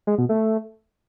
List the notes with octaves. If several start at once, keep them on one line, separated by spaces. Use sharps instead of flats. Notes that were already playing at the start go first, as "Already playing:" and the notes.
G#3
B2
A3